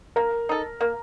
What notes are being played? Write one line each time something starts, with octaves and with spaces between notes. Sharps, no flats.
A#3 A#4
D#4 A4
A#3